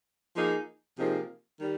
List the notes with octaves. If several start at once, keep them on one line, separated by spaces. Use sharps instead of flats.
F3 A#3 D#4 G#4
C3 F3 A#3 D#4 G#4
D#3 G3